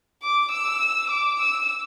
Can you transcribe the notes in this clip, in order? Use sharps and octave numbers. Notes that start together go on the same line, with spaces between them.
D6
E6
D6
E6